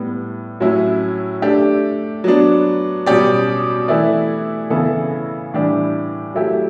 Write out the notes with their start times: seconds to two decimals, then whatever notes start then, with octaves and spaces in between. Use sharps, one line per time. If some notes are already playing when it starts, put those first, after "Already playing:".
Already playing: A2 G3 B3
0.60 A2 F#3 C#4 E4
1.42 A3 D4 G4
2.24 F#3 B3 D4
3.06 B2 G3 C#4 G4 D5
3.88 E3 A3 E4 B4 D5
4.70 C#3 E3 B3 E4 A4
5.53 A2 E3 G3 D4 G4
6.34 F#3 A3 E4 G4